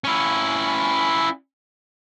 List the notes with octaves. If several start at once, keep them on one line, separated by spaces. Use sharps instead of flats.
C#4 E4